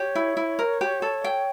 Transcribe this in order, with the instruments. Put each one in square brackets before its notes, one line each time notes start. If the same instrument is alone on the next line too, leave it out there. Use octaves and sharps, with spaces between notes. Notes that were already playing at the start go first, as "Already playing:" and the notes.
Already playing: [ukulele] G4 [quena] C#5
[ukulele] E4
E4
A#4
G4
A4
G5